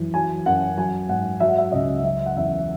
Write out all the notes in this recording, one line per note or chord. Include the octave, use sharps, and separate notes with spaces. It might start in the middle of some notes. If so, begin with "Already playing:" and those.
Already playing: F#2 E3
F#3 G#5
F#2 F#5
F#3 G#5
G#2 F#5
F#3 E5
F#5
E5
C#2 D#5
F#3 E5
F#5
E2 E5